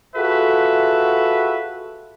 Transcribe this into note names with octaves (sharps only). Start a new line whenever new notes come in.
F4 F#4 G#4 A4 B4 E5